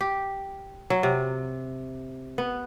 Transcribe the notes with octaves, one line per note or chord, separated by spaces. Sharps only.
G4
F#3
C3
B3